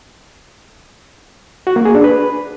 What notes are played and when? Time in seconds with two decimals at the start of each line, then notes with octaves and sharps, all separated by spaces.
1.67 F#4
1.76 A#3
1.85 G#4
1.95 D4
2.04 B4